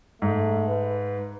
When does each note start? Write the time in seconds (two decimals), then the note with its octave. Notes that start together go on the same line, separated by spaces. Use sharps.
0.22 G#2 A3
0.68 B4